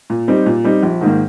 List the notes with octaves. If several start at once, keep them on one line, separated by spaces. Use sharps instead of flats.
A#2
G3 C4 D#4
A#2
G3 C4 D#4
A#1
G#2 D#3 A#3